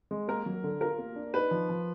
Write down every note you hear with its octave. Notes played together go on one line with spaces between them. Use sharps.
G#3
A#3 A#4
F#3
D3
F4 A#4
A#3
D4
D#4 B4
F3
F3